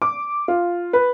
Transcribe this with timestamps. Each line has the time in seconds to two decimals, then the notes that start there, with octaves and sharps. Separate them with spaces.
0.02 D6
0.48 F4
0.93 B4